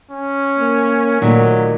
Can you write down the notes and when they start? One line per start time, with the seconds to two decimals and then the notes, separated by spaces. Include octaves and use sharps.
0.12 C#4
0.59 A#3
1.22 A#2 D#3 F#3 A3